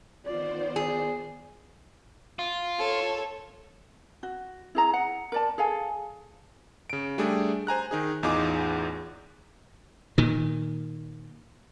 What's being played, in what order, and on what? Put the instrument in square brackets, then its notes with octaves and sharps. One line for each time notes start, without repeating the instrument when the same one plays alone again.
[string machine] D#3 B3 C5 [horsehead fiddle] F4 D5
[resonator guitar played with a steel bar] G#4
[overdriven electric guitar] F4
[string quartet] A4 C#5
[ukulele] F#4
E4 G#4 A#5
F#5
A#4 D5 A5
G#4 A4 F5 G#5
[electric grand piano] C#3 D7
G3 A3 D4 G4 G#4
C5 G#5 A#5 F#6
D#3 D#4 G#4
A1 E2 D#4 F4 G#4 D6
[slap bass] A#2 D#3